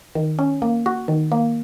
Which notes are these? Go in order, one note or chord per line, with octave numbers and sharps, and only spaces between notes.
D#3
C#4
A#3
F#4
D#3
A#3